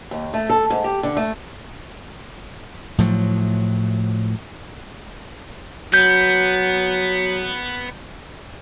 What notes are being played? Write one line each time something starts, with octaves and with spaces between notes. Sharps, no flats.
D#2
A3
A4
G#2
G4
D3
A3
A2 F3 F#3
F#3 B3 G6